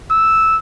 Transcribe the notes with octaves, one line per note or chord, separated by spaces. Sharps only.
E6